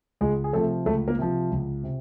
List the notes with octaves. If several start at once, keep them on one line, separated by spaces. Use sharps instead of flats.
C#2 G#3 G#4
G#4
C3 F3 A3 A4
C#2 A3 A4
A#3 A#4
C3 F3
C#2
C3